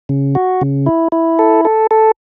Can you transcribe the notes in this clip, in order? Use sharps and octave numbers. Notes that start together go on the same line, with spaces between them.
C#3
F#4
C#3
E4
E4
A4
A4
A4